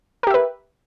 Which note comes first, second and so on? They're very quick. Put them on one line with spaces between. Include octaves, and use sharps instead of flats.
A#4 G4 E5 B4